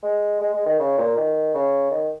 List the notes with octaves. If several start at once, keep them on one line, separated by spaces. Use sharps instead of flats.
G#3
G#3
G#3
D#3
C#3
A#2
D#3
C#3
D#3